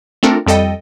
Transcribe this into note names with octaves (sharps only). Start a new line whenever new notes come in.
A3 C4 D4 F4 A4 A#4
F2 G3 A4 D#5 G5